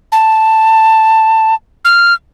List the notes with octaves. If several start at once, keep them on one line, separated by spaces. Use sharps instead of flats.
A5
F6